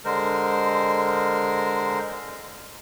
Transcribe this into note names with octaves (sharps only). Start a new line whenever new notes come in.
D3 G#3 A#4 C5